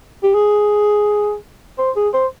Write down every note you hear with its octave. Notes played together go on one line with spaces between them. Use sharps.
G4
G#4
C5
G#4
C5